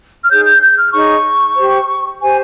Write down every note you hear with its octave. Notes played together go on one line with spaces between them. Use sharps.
F6
D#4 G#4 C#5 G6
G6
G6
F6
D#4 G#4 C#5 C#6
G4 C5
G4 C5 G#5